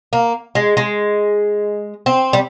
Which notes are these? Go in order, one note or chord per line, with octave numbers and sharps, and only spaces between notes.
A#3
G#3
G#3
C4
G3